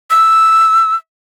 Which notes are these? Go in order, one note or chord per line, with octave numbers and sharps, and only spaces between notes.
E6